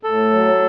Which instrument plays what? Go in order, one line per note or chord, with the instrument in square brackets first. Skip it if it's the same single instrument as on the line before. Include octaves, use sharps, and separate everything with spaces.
[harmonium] A2 [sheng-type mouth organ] A4
[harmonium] F#3